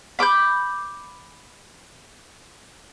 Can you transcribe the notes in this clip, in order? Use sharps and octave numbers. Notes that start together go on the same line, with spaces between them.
B5 D6 E6 G6